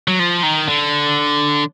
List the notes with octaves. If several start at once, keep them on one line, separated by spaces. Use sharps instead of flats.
F#3
F3
D#3
D3